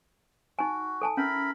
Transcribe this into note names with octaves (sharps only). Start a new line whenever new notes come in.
D#4 F#4 G#5
A4 G#5 A5
C#4 E4 A#4 B5